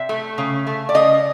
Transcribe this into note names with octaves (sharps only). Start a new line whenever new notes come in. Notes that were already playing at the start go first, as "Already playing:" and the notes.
Already playing: C3 E5
A3
C#3
A3
D5
C#3 D#5